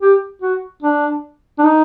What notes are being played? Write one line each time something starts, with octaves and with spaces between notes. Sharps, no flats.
G4
F#4
D4
D4
D#4